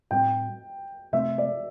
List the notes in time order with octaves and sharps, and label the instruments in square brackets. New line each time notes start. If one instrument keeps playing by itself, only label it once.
[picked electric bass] A2 G3 C4 [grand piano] G5
[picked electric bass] C3 A3 C4 [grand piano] E5
[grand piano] D5